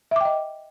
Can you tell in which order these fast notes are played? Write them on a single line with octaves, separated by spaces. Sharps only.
E5 D6 G5 D#5